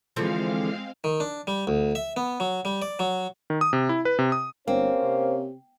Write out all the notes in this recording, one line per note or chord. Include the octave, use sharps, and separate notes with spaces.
D3 E3 F3 G#3 C4 F5
D#3
D4
G3
D2
E5
B3
F#3
G3
D5
F#3
D#3
D#6
C3
E4
B4
C3
D#6
G1 A#3 C4 C#4 G4 C#5
C3